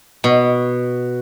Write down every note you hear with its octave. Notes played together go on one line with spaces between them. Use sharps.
B2